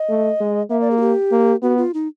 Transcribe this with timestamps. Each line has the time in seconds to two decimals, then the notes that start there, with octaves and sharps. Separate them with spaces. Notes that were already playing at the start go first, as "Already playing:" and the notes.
Already playing: D#5
0.09 A3
0.40 G#3
0.70 A#3 E5
0.81 D5
0.91 G#4
0.97 F#4
1.01 G4
1.32 A#3
1.62 B3 F#4
1.78 F4
1.94 D#4